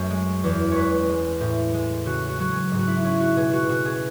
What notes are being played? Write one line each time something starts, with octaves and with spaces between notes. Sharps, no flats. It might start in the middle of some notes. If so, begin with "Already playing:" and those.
Already playing: F#2 A3
G#3
E2
G#3 B4 C#5
G#3
A2
G#3
C#3 F#4
F#4
F#3 F#4
G#4
G#2
F#4
E4
C#4 E4
F#4
B2 G#4
F#4
B2 F#4
G#4